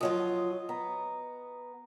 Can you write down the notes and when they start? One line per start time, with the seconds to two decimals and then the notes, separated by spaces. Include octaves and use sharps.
0.01 F3 F#3 F4 D#5
0.69 B3 A#5